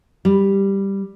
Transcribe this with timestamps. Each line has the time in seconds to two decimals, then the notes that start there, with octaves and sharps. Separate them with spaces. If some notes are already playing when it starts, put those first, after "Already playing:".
0.25 G3